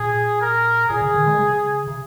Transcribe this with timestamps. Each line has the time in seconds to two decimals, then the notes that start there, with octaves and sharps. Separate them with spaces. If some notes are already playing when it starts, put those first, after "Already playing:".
Already playing: A#2 G#4
0.41 A#4
0.90 A#2 G#4
1.02 C#3
1.14 D#3
1.27 G#3
1.39 C#3
1.87 C#3